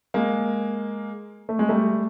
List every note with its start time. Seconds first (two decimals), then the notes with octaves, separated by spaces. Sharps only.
0.14 G#3 A#3
1.49 A3
1.59 G#3
1.69 G3 A3